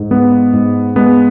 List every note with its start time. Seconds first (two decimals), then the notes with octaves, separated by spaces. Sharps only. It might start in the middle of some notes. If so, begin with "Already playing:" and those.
Already playing: G#2
0.11 G#3 B3
0.53 G#2
0.96 G#3 B3